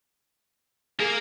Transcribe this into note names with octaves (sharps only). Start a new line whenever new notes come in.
A#3 G#4 A#4